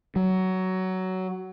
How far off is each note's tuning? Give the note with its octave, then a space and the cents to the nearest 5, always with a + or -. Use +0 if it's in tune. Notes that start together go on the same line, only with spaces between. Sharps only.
F#3 +15